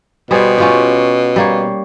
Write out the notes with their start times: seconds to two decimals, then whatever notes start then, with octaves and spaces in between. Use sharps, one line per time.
0.31 B2 G3 G#4 C5
0.58 C#4 F4 G4
1.36 G3 A#3 C#5